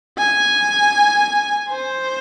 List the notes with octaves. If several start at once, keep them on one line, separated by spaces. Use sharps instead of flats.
G#5
C5